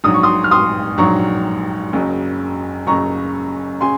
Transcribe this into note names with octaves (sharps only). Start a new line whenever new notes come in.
A#1 G#2 F#3 D#6
C#6
C6 D#6
F6
C6 D#6
A#1 G#2 F#3 A#5 C#6
F#1 F#2 C#3
F#1 F#2 C#3 A#5 C#6
C#3 G#5 C6